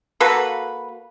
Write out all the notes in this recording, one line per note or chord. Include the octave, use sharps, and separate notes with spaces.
A#3 F#4 A4 B4